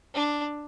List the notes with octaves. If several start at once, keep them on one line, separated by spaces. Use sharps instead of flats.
D4